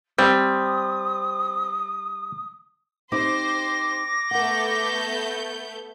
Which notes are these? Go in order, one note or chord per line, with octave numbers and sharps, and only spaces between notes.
G3 C4 D#6
C4 D#4 G4 C5 D6 A#6
A3 B3 A#4 F#5 G6